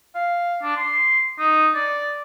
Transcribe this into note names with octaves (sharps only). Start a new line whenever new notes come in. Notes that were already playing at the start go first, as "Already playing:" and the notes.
F5
D4
C6
D#4
D5